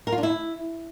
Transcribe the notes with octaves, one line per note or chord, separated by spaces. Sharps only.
A#4
F4
D4
E4